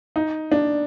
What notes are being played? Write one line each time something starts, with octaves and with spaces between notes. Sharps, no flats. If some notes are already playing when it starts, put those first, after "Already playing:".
D#4
D4